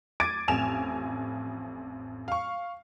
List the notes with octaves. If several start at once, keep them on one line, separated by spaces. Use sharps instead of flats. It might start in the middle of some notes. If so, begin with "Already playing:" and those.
D6 G#6 A6 D7 D#7
A1 F2 G#5 E7 F7
F5 C#6